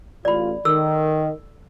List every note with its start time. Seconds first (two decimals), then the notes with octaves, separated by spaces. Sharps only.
0.25 A1 F4 D5 B5
0.65 D#3 A4 E6